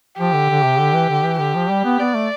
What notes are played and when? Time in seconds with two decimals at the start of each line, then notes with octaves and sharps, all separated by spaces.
0.19 F3 G4
0.34 D3
0.50 D3
0.64 C3
0.80 D3
0.95 E3
1.09 D3
1.24 E3
1.39 D3 G4
1.55 F3
1.70 G3
1.85 B3
1.99 B3 D5
2.15 A3